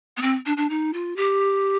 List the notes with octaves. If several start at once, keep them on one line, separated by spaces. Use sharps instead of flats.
B3
C4
D4
D4
D#4
F4
G4